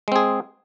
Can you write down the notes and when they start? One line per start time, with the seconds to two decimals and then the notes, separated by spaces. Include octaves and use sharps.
0.08 G#3
0.12 C4
0.16 G#4